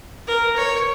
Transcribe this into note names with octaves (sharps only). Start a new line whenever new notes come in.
A#4
C#5